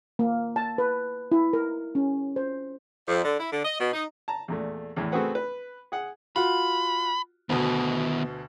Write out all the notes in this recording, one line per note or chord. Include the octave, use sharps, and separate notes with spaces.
A#3
A5
B4
E4
A#4
C#4
C5
F2
D3
E4
D3
D#5
B2
D#4
A5 A#5
E2 A#2 A3
E2 A2 E3
A3 C4 F#4 G#4 B4 F#5
B4
G#4 F#5
F4 F#4 B5
D2 B2 D#3 B3